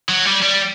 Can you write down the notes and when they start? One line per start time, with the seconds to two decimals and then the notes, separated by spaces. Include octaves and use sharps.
0.09 F#3
0.26 G3
0.42 G3